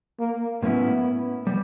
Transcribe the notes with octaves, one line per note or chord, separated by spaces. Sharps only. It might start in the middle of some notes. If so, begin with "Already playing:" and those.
A#3
A2 F#3 A#3 B3 C#4 E4
G3